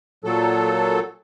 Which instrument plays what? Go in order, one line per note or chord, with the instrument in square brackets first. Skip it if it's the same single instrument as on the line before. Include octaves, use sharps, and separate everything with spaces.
[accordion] A#2 F#3 A4